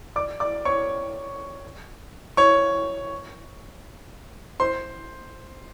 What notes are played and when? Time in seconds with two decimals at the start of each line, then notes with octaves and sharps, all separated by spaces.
0.16 D5 D6
0.40 D5 D6
0.65 C#5 C#6
2.37 C#5 C#6
4.60 C5 C6